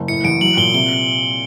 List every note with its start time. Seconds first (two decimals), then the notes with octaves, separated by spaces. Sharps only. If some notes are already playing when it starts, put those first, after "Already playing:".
Already playing: F#1
0.08 A2 C#7
0.24 A1 D7
0.41 F#3 F#7
0.57 A#2 G7
0.75 C3 G7